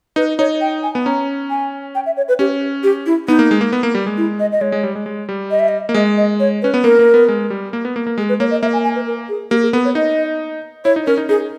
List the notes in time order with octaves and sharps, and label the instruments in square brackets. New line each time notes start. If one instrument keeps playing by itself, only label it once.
[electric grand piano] D#4 [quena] B4
[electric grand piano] D#4 [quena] C#5
[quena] G5
G#5
[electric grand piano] B3
[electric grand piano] C#4 [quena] A#5
[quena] G#5
G5
E5
C#5
B4
[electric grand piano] C#4 [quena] G4
[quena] G4
E4
[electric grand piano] B3 [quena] D#4
[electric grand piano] A#3
G#3
A#3
B3
A#3
G3
G#3
[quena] E4
D#5
D#5
[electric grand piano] G#3 [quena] C#5
[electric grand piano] G#3
G3
G#3
G#3
G3
[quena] D#5
E5
D#5
[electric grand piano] A#3
[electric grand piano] G#3 [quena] D#5
[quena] D#5
C#5
[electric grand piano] C#4 [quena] B4
[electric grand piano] B3
[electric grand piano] A#3 [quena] A#4
[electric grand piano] A#3
B3
G#3
G3
A#3
B3
A#3
A#3
[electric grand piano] G#3 [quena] G#4
[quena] B4
[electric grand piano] A#3 [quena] C#5
[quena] D#5
[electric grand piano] A#3 [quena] E5
[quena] G#5
G#5
B4
A#4
G#4
[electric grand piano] A#3 [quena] G4
[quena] G#4
[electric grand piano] B3 [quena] A#4
[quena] C#5
[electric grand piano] D#4 [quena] D#5
[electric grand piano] E4 [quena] C#5
[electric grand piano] D#4
[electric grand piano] C#4 [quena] A#4
[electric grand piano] D#4
[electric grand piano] D#4 [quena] G#4